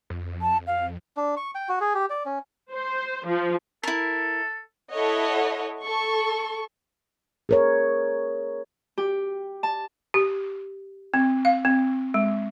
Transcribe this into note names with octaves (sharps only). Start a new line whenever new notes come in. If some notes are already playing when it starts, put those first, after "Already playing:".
F2
A5
F5
D4
C#6
G5
F#4
G#4
G4
D5
C#4
C5
F3
E4 A4 A#4
E4 A4 C#5 D#5 F#5
A4 C#6
G#4 A#4 C#5
G4
A5
G4
C4
F5
C4
G#3